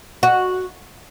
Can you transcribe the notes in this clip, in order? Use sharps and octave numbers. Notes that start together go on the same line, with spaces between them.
F#4